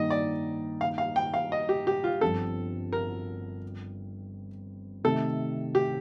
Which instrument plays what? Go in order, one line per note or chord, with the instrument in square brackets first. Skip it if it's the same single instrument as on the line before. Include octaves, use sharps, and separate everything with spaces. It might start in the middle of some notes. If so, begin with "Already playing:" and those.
Already playing: [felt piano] G2 D#3 A#3 D#4 [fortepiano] D#5
[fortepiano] D5
F5
F5
G5
F5
D#5
G4
G4
F4
[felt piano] G1 G2 F3 C4 [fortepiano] A4
[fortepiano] A#4
[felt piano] C3 D#3 A3 [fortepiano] A4
[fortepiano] G4